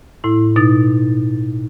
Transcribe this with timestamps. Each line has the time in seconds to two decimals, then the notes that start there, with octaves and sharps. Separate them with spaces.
0.24 A2 E4
0.56 B2 D#4 A6